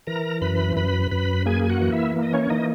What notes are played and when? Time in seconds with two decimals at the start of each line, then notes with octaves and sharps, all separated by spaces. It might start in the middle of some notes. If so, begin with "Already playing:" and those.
0.07 E3 A#4 A#5
0.41 F#2 B4 B5
0.76 F#2 B4 B5
1.11 F#2 B4 B5
1.46 A#3 G#4 G#5
1.64 G#5
1.69 F#4 F#5
1.80 E3
1.92 E4 E5
2.16 A#3
2.22 D#5
2.33 C#4 C#5
2.50 E3 D#4 D#5